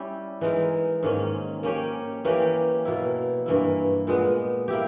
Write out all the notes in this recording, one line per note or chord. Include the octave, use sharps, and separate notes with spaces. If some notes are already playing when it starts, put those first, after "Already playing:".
Already playing: G3 C#4 E4 G4
E3 G#3 D#4 A#4
G#2 D#3 A#3 C#4
A#3 C#4 G4 C#5
E3 A#3 C#4 G4
B2 A#3 E4
G2 E3 A#3 E4
A#2 G#3 B3
A#3 E4 G4